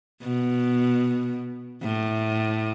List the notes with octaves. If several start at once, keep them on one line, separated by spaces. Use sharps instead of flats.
B2
A2